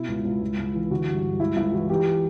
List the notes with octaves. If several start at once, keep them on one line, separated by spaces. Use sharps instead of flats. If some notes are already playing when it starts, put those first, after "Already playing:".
Already playing: B2 E4
C#2
C#2
C#2
C#2
E3
D3 F#4
G2
G2
C#2 E4
C#2 E4
E3 F#4
E3 G4